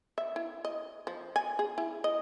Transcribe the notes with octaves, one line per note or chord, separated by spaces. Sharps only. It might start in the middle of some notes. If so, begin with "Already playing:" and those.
E5
E4
D#5
F3
G#5
G#4
E4
D#5